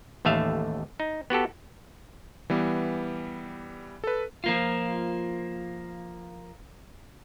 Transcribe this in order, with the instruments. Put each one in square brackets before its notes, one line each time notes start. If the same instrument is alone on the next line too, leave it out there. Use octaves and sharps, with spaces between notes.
[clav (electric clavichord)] A1 D#2 A3 E5 F5
D#4
B3 F#4 G4 A4
[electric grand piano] E3 G3 B3
A4 B4
[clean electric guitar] F3 A#3 F4